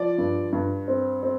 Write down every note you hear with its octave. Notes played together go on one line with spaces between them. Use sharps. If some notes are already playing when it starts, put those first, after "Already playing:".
Already playing: F3 D5
G2
G2
C4
C4